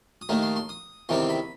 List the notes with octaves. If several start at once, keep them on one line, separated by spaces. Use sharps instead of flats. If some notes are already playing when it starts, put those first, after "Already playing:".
D#6
D#2 D#3 A3 D#4 C6
C6
C6
D#6
E2 C3 D#3 G3 C4 C6
B5